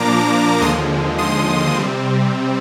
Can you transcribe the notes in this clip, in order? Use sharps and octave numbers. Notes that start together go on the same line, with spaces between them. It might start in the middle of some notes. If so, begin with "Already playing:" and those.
Already playing: A#2 F3 A#3 D4 A#5 D6
D#2 D3 F3 G#3 C6 D#6
C6 D#6
C3 G3 C4